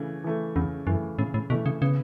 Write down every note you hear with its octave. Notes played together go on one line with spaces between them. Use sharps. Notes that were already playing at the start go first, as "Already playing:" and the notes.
Already playing: C#3 E3 A3
E3 A3
E2 C#3
F#2 E3 A3
A2 C#3
A2
B2 E3 A3
C#3
C#3 B3